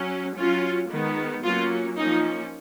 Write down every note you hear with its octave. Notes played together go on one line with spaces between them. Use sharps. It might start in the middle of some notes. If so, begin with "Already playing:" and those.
Already playing: F#3 C#4
F#3 C#4 F4
D#3 G#3 B3
F#3 A#3 C#4 F4
F3 A#3 C#4 D#4